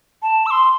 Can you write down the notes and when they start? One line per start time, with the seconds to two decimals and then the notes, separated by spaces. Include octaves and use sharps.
0.23 A5
0.46 E6
0.51 C6